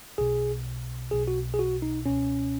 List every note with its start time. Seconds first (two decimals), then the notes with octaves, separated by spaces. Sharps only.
0.18 B1 B2 G#4
1.11 B1 B2 G#4
1.28 F#4
1.54 G#4
1.59 F#4
1.82 D#4
2.06 C#2 B2 C#4